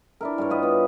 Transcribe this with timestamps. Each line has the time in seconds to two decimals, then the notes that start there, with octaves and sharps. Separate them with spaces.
0.21 D4 E4 A#4
0.38 G2 A#4 C#5
0.50 F4 B4 D#5
0.63 B3